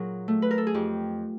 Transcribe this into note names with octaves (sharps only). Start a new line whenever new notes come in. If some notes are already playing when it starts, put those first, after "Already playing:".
Already playing: A#2 F#3 G#4 A#4
A3
B4
A#4
A4
G#4
F2 G4